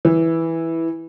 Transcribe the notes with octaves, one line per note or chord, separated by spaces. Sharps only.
E3